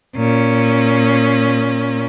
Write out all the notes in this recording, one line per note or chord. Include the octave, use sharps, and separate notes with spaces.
A#2 C#4